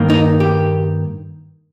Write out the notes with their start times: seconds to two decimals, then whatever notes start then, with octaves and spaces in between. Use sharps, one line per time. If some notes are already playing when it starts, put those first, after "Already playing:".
Already playing: G2 D#3 A#3
0.10 D#4
0.40 G4